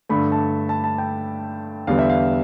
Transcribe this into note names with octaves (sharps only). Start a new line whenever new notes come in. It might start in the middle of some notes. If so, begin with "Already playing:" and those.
G2 D3 A3 B5
A5
A5
A5
G5
E2 D3 G3 B3 F5
E5
F5